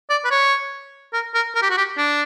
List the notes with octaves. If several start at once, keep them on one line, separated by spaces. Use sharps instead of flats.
D5
B4
C#5
A#4
A#4
A#4
G4
F#4
G4
D4